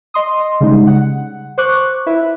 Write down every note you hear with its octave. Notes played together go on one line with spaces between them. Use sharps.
D#5 C6 D#6
C#3 G3 G#3 D#4
F#5
C5 C#6 D6 F#6
E4 B4 E5